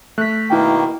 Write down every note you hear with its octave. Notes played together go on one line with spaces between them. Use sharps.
A3 F#6 B6
B2 D#3 A#3 E4 G5